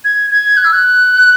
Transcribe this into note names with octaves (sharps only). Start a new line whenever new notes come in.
G#6
G#6
F#6
E6
F#6